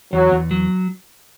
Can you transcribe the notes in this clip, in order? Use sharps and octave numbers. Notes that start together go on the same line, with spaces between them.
E2 F#3
E2
F#3